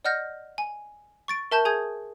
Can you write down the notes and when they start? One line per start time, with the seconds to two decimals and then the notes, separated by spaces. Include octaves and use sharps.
0.05 D5 D#5 F#5 F6 G6 A#6
0.58 G#5
1.28 C#6 A6 D7
1.51 A#4 E5 A5 C#6 G6 E7
1.65 G#4 G#5 D#6 G6 G#6